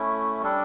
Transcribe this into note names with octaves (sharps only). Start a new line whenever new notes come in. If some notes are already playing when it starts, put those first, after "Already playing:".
Already playing: A3 C#4 E4
G3 D4 A4